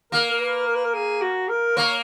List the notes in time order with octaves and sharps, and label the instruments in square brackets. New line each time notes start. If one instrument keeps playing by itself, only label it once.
[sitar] A#3 [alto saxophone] A#4
[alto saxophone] A#4
B4
A#4
B4
A#4
G#4
F#4
A#4
[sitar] A#3 [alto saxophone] C#5